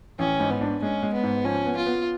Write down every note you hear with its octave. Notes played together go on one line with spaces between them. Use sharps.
A1 C#4
G#2
B3
D4
G#3 C#4
G#3
B3
G#2
F3 C#4
B3
F4
B3